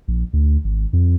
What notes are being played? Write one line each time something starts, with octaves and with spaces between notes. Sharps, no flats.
A#1
D2
G#1
F2